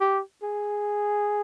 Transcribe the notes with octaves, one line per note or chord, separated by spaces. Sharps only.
G4
G#4